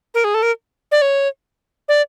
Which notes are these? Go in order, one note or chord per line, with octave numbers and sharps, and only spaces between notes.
A#4
G#4
A4
A#4
D5
C#5
D5